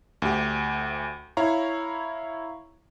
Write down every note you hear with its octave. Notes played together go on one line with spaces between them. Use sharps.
D2 G4
E4 C#5 F5 A#5 C#6